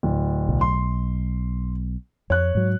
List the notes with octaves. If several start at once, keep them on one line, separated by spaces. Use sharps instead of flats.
D1
B1
C6
F2 C#5 F#6
G#2 F#3